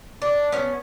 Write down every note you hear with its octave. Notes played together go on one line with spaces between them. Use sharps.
D4
B3 C#4